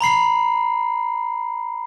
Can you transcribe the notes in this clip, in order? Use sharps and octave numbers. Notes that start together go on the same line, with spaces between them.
A#5 B5 C7